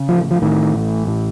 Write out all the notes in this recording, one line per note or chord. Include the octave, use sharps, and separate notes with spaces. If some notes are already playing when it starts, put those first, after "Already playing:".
Already playing: C#3
A1 F3
F3
A2 D#3
A1
A2